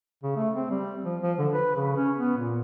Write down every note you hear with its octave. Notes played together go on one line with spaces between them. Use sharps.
C#3
A3
C4
G3
F3
F3
D3
B4
C#3
C#4
B3
A#2